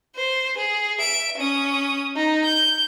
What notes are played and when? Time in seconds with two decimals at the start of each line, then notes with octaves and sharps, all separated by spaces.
0.15 C5
0.57 G#4
1.00 E5 D7
1.37 C#4 D#6
2.16 D#4
2.44 G6